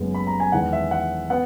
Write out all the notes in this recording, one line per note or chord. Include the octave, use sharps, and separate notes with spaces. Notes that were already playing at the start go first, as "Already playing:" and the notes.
Already playing: F#1 F#2 C#3 G#3 B3
B5
A#5
G#5
E2 D#3 G#3 F#5
E5
F#5
B3 F#5